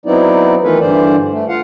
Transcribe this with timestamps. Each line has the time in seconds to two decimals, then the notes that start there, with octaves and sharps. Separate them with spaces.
0.06 F#3 B3 C4 D#4 E4 D5
0.64 D#3 E3 A3 F4 A4 B4
0.80 G2 D3 E3 C5 D5
1.32 A3
1.49 F4 F5 F#5